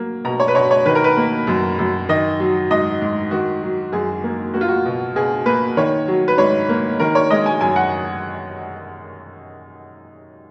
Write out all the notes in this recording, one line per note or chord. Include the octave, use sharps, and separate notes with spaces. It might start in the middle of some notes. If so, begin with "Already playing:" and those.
Already playing: F#3 A#3
B2 A#5
C#5
B4
B2 C#5
C#5
D#3 B4
A#4
B4
A#3
F#2
F#2
D#3 D#5
F#3
G#2 D#5
G#2
D#3 F#4
F#3
F#2 G#4
A#3
A#3 F#4
F4
F#4
B2
B2 G#4
A#3 B4
D#3 C#5
F#3
B4
G#2 C#5
A#3
D#3 A#4
C#5
G#3 D#5
G#5
F#2 G#5
F#5